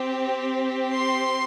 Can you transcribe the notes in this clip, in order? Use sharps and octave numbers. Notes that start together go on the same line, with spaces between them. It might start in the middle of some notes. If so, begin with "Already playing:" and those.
Already playing: C4 G4
C6